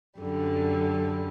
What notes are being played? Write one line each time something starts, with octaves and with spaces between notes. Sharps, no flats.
F#2 D3 G3